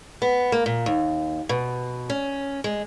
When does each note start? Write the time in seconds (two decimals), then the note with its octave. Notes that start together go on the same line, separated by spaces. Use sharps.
0.22 B3
0.52 A#3
0.66 A#2
0.86 D#2
1.49 B2
2.10 C#4
2.64 G#3